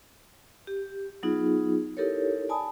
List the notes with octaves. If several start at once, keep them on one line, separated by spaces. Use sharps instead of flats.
G4
F#3 B3 D#4 F4 G#4
D#4 E4 G4 A4 A#4 C#5
D5 G#5 A5 B5 D#6